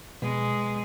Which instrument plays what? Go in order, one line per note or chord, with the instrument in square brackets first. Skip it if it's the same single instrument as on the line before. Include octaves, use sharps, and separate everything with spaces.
[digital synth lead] B2 [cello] G#3